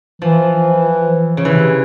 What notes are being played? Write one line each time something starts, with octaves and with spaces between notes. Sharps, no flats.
E3 F3
C#3
C3 E3